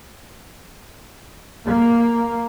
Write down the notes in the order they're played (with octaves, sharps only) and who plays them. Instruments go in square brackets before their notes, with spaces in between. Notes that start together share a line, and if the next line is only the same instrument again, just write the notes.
[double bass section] A#3